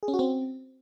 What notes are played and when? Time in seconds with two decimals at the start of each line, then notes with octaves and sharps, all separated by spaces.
0.03 G#4
0.08 C#4
0.14 F#4
0.19 C4